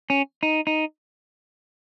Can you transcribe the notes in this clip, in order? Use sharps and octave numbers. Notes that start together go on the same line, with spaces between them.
C#4
D#4
D#4